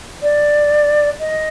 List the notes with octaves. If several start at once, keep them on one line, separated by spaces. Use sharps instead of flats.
D5
D#5